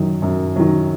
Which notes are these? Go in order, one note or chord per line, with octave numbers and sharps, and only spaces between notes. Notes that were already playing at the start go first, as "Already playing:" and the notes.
Already playing: F#2 D#3 F#3 D#4
F#2
D#3 F#3